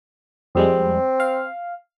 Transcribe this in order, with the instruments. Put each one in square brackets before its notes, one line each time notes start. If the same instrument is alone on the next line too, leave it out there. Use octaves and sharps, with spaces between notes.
[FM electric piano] F2 G3 G#3 [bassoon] C4
[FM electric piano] F5